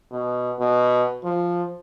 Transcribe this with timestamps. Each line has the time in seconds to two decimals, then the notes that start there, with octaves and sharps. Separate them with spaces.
0.11 B2
0.59 B2
1.24 F3